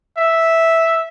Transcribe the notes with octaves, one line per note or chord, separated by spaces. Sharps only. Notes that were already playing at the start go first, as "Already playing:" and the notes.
E5